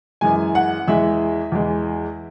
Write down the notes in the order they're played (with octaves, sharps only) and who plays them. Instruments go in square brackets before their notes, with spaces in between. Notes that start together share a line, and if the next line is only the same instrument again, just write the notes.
[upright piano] F#2 E3 G#3 G#5
F#5
E2 E3 G#3 E5
E2 E3 G#3